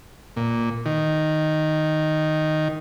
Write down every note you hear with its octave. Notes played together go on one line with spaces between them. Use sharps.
A#2
D#3